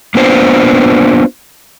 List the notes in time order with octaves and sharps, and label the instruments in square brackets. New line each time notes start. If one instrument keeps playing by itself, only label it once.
[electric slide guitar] A#3 B3 D4 F4 B4 C5